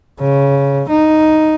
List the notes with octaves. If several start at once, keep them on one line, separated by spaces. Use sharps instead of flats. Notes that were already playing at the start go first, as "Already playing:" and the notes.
C#3
D#4